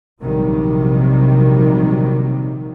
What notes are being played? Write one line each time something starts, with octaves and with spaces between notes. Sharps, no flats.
A#1 C3 D#3 F#3 G3